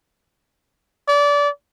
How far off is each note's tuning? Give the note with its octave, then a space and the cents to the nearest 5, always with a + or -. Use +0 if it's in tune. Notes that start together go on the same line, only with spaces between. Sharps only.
D5 -25